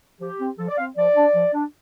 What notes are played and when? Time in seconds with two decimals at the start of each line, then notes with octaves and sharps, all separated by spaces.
0.20 F3 G4
0.39 C4
0.58 F3 A4
0.68 D5
0.78 C4 F5
0.96 F3 D5
1.15 D4
1.34 F3
1.54 D4